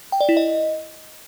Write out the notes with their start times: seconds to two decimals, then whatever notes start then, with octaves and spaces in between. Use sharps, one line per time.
0.12 G5
0.21 D5
0.29 E4
0.37 D#5